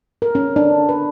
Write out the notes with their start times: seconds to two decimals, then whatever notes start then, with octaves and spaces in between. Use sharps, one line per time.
0.22 A#4
0.35 C#4
0.56 D4
0.89 B4